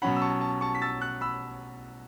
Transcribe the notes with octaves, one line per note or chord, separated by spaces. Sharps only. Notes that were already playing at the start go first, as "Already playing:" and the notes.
B2 F#3 C#4 F#5 B5
E6
A5 C#6
A5
A5 C#6
B6
E6 A6
C#6 F#6
B5 E6